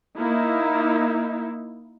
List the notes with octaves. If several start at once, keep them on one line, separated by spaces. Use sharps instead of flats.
A#3 D#4 E4